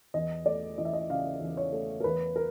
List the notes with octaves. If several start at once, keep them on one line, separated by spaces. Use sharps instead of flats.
E2 D#5
A3 D5
E3 D#5
E5
D#5
C#3 F5
E2
C#5
A3
A#4
E2 B4
A#4